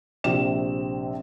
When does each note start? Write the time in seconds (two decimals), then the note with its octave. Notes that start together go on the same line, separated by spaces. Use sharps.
0.24 A#1 C3 E7